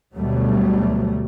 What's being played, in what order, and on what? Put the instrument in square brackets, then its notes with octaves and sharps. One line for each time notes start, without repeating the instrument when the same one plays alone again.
[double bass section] D2 B2 F#3 G3 A3